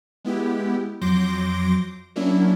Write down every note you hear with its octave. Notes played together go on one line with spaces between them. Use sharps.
G#3 B3 E4 G4
F2 F#3 C6 D6 G6 A#6
F#3 A#3 C#4 D4 E4